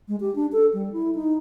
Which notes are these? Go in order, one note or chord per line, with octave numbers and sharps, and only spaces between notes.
G#3
G4
D4
A4
G3
E4
D#4